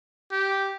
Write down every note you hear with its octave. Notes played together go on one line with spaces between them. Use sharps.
G4